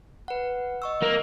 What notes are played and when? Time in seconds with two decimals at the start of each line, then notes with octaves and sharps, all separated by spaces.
0.28 B4 F#5
0.82 D#5 C#6 E6
1.03 A#3